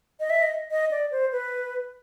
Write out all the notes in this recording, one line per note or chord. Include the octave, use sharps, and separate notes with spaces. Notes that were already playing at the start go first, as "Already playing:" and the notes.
D#5
E5
D#5
D#5
D5
C5
B4